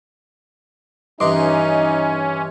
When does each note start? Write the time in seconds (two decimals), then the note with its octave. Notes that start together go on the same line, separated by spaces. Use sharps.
1.20 G2 D#3 E3 C#4 D#4 D#5 C6 D6